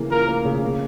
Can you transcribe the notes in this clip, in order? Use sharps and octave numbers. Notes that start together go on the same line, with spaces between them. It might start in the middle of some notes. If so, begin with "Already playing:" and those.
Already playing: C#3 E3 A#3
F4 A#4
A#3
C#3
A#3